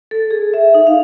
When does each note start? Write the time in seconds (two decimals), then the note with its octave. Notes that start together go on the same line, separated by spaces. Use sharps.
0.11 A4
0.31 G#4
0.54 E5
0.74 D#4
0.87 F5